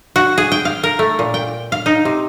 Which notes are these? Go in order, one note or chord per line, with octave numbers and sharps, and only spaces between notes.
F#4
G#4
G5
F5
A#4
A3
A#2
G5
F5
D#4
C3